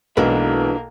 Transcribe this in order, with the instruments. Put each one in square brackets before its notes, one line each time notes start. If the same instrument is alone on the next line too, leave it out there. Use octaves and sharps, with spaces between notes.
[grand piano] B1 [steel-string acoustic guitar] E3 G#3 [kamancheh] A#3 [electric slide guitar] D4 F#4 B4